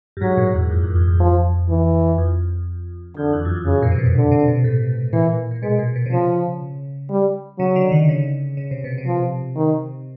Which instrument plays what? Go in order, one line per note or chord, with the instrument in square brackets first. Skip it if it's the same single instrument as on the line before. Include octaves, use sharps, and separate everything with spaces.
[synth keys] G2
[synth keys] G#2 [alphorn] F#3
[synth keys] A#2
E2
F2
E2
F2
F2
[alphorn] F3
E3
[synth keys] F2
[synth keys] F2 [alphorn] D3
[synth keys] E2
F#2
F2
[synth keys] F#2 [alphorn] C#3
[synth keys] A#2
C3
B2
[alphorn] D3
[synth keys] C3
B2
A2
[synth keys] A#2 [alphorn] E3
[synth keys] A#2
[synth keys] B2 [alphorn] G#3
[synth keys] A#2
B2
C3
[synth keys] C#3 [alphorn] F3
[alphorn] G3
[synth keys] C#3 [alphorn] F#3
[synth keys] D3
D#3
C#3
C#3
C3
B2
C3
[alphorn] F3
D#3